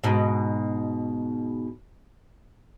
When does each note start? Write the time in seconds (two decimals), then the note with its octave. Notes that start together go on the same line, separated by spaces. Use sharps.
0.04 G#2 B2